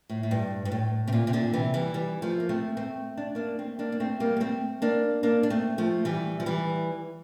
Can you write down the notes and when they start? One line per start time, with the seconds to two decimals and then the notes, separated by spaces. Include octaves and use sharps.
0.09 A2
0.23 A2
0.31 G2
0.65 G2
0.72 A2
1.07 C3
1.13 A#2
1.27 C3
1.33 A#2 D3
1.53 C3 E3
1.74 E3 G3
1.94 E3 G3
2.22 F3 A3
2.40 A#3
2.49 A3 C4
2.77 A3 C4
3.17 D4
3.35 A#3 D4
3.59 A3 C4
3.79 A#3 D4
3.92 A#3
4.00 A3 C4
4.20 G3 A#3
4.37 A#3
4.40 A3 C4
4.82 A#3 D4
5.23 A#3 D4
5.43 D4
5.50 A3 C4
5.78 F3 A3
6.05 E3 G3
6.40 F3
6.46 E3 G3